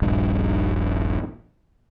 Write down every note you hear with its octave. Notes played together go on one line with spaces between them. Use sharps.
D#1 A#1 G2